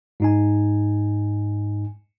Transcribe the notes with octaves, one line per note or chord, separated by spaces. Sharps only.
G#2 D#4 G#5